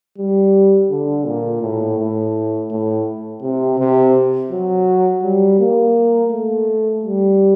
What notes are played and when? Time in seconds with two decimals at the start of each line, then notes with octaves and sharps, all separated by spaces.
0.18 G3
0.90 D3
1.26 A#2
1.62 A2
1.99 A2
2.71 A2
3.42 C3
3.79 C3
4.50 F#3
5.23 G3
5.60 A#3
6.31 A3
7.04 G3